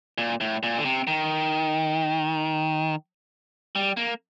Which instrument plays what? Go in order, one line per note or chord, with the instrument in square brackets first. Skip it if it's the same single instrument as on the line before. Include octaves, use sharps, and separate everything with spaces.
[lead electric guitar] A#2
A2
A#2
D3
C3
D#3
G3
A#3